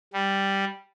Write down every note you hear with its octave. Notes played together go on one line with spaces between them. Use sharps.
G3